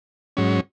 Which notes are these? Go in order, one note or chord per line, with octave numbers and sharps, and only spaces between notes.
G#2 F#3 C#4